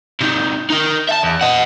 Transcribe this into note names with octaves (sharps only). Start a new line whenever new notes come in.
C3 D#3
D#4 A#4
E5 A5
E2
D#5 F#5